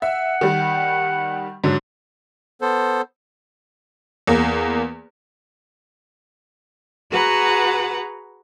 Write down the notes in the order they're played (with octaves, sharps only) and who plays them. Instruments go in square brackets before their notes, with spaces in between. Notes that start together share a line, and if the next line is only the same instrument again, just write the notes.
[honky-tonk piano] E5 [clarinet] F#5
[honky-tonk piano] D#3 G3
G#2 D3 F#3
[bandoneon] B3 A4 C5
[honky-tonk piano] E2 A#3
[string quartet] F#4 G#4 B4 F#5 A#5